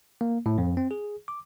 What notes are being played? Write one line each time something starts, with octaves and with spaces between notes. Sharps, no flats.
A#3
A2
F2
C4
G#4
D6